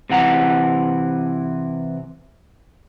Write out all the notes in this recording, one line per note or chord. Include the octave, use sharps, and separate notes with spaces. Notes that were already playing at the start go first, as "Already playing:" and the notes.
C3 E3 F#5 A#5